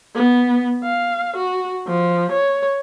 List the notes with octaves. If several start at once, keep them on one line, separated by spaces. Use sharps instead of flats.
B3
F5
F#4
F3
C#5